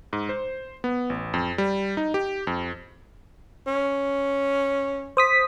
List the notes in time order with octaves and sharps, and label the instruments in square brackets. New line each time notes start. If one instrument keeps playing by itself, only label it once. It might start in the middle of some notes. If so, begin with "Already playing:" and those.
[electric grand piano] G#2
C5
B3
A1
F2
G3
D#4
G4
F2
[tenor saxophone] C#4
[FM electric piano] C5 D#6 B6